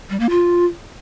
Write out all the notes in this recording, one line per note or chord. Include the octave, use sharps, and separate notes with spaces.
G3
A#3
F4